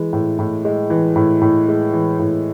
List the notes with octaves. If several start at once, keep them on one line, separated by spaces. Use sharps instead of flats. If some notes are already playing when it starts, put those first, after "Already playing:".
Already playing: E3 G#3
A2
A2
G#3
E3
A2
A2
G#3
E3
A2